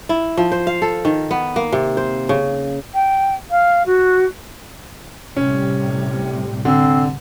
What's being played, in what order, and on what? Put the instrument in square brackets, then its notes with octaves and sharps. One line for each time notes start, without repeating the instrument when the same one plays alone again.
[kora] E4
F3
C5
F5
A4
D#3
B3
A#3
C3
C5
C#3
[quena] G5
F5
F#4
[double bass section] A2 C3 G3 [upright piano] C#4
[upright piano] D3 [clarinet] C4